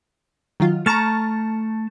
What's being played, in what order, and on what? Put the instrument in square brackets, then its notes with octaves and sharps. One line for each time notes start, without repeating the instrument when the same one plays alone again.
[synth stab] D#3 F#3 F4
[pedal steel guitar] A3 A5 [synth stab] A#5 C#6 F6